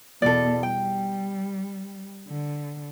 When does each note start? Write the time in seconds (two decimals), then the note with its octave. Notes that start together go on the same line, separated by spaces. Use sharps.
0.22 E2 B2 A4 D5
0.63 G3 G5
2.28 D3